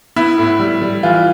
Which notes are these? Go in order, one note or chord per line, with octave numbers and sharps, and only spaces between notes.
B3 E4
A2
G3
G3
E3 F4